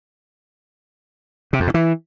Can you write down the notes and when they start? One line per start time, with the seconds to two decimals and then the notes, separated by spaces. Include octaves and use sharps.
1.53 C3
1.60 F2
1.67 B2
1.74 E3